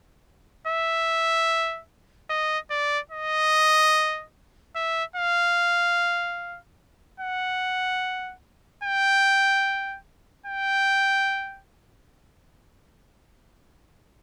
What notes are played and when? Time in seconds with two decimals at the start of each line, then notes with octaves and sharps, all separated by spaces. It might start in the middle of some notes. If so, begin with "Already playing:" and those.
0.67 E5
2.30 D#5
2.71 D5
3.11 D#5
4.76 E5
5.16 F5
7.20 F#5
8.84 G5
10.46 G5